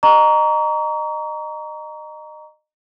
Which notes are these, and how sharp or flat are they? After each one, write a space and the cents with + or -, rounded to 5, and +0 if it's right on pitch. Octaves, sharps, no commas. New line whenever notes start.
D#5 -30 A#5 +0 C#6 +40